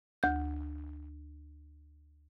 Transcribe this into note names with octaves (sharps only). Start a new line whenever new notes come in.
D2 G6